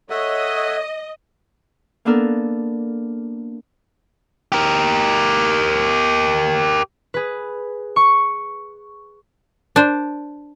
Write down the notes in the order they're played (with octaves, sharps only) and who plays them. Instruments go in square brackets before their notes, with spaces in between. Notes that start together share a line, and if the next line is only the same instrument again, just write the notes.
[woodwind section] A4 C#5 [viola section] D#5 [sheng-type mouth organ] E5 F#5
[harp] A#3 B3 D4 A4 A#4
[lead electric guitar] G4 A#4
[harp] G#4 B4
C#6
[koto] D4 C5